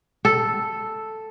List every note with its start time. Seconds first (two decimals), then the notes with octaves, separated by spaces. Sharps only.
0.25 A4